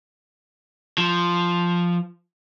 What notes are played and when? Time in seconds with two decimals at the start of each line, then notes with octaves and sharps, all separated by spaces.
0.98 F3